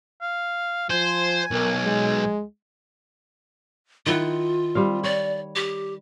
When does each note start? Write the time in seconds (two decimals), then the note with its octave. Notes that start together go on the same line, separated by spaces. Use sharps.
0.21 F5
0.90 F3 C5 G#5
1.51 B1 A#4
1.84 G#3
4.06 D#3 E4 F4 F#5
4.75 G3 C4 F5
5.04 C#5 D5
5.56 G4